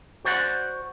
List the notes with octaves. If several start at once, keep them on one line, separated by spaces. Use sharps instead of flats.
F#4 C5 D5 F5 F#5